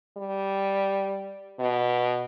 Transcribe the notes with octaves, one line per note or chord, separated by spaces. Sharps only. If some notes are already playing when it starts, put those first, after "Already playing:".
G3
B2